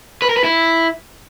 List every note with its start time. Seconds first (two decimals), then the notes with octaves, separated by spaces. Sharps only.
0.22 B4
0.29 A#4
0.37 B4
0.44 E4